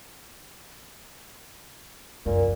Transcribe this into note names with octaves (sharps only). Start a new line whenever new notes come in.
C2 F#2 A#2